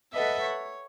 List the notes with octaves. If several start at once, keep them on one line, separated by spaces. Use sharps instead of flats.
A4 B4 D#5 E5 F#5
C#5